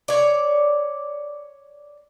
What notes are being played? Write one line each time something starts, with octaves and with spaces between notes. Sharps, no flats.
C#5 D5